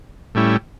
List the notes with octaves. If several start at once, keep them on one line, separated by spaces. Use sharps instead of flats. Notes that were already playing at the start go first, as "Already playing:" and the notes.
A2 G3 C#4 E4